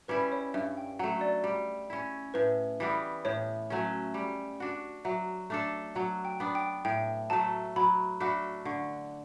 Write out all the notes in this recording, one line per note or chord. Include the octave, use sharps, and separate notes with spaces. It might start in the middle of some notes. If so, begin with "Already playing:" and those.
G3 C#4 E4 B4
C#5
G2 E5
G5
F#3 A3 F#5
D5
G3
C#4 E4
A2 B4
E3 G3 B3
A2 C#5
F#3 A3 C#4
G3
D4 F#4
F#3 E5
A3 D4 A4
F#3 F#5
G5
B3 D4
G5
A2 G5
F#3 A3 A5
F#3 B5
A3 D4 F#4 B5
D3 C#6